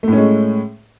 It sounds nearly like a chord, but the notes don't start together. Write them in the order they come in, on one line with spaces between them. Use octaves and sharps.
A3 A2 C#4 G#3